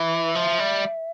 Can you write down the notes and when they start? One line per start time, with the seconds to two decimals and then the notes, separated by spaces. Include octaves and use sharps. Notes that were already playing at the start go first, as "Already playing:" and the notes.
Already playing: E3 E5
0.35 F3
0.59 G3